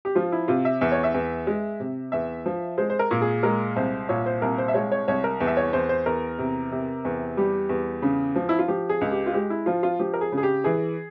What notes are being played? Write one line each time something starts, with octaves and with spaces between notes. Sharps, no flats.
G4
F3 F4
E4
C3 F4
E5
E2 E5
C#5
E5
E2
G#3
C3
E2 E5
F3
G#3 C5
C5
A#4
A#2
G#4
G#3 A#4
C2 C5
A#2 C#5
C5
C2 A#4
C5
E5
G#3 C#5
C#5
C2 C#5
A#4
E2
E5
C#5
E2 C5
C5
E2 A#4
C3
C3
E2
G3 G4
E2
C#3
F3
E4
F4
F3 G4
G#4
C#2
G4
F4
G#3 G4
E4
F3 F4
F4
F3 G4
A#4
G#4
C#3
G#4
G4
E3 G#4